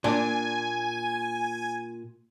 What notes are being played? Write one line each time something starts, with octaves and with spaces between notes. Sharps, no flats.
A#2 D4 G#5